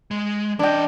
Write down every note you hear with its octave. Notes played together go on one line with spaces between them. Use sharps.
G#3
E3 D4 D#5 G5